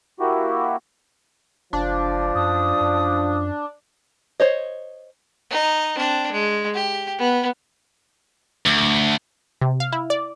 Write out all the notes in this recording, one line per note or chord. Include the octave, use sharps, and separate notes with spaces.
A#3 E4 F#4 G4
F#1 F3 D4
F#2 D#6
F#2
C5 C#5 D#5
D#4
C4 D4
G#3
G4
B3
D2
C3
F5
E4
D5